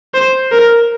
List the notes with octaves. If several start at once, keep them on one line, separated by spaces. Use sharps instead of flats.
C5
A#4